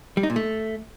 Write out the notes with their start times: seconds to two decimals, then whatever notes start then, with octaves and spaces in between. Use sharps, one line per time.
0.17 G3
0.23 D#4
0.30 A#2
0.36 A3